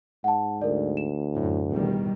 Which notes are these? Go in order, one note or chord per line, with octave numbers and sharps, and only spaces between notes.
G#2 F#5 A5
D2 A#4 D5
E7
F#2 A2
E2 B2 D#3 G3